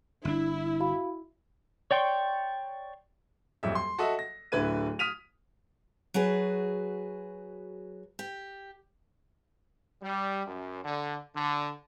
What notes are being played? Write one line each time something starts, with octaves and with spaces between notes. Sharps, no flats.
G1 D4 E4
F#4 F5 B5
C#5 D5 G5 C6 C#6
D#1 B1 F2 E5
C6
F#4 A4 D#5 E5
A#6
D1 D3 E4 B4 G#6 D#7
D#6 F6 B6 D#7 F7
F#3 F#4 G#4 B4
G4
G3
F#2
D3
D3